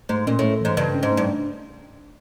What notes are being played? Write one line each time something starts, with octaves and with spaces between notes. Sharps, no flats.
G#2 A3
A#2 C#4
A2 A3
G#2 E3
G2 C#3
C#4
G#2
A3
G2
D4